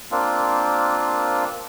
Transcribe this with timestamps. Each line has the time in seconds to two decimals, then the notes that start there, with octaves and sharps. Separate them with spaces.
0.11 A#3 C4 D4 F4